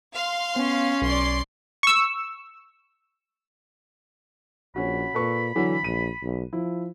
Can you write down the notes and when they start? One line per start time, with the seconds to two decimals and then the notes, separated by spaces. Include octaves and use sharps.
0.13 F5 C6
0.56 B3 C#4
1.02 B1 D5 C6
1.83 C#6 E6
4.76 A#1 C#4 F#4 B5
5.14 A#2 A4 B4 C#6
5.55 D3 E3 F#3
5.84 A#1 D#7
6.22 B1
6.53 F3 E4